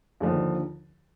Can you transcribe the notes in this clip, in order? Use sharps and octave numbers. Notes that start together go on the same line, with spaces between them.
D#2 D3 F3